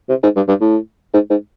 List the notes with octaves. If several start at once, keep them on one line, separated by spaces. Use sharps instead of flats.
C3
G#2
G2
G2
A2
G#2
G#2